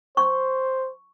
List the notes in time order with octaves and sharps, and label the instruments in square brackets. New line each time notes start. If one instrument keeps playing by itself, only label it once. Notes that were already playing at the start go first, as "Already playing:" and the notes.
[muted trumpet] C5 [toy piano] C#6